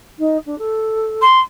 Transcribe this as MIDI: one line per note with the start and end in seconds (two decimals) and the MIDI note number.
0.19 0.37 63
0.46 0.58 62
0.58 1.22 69
1.22 1.40 84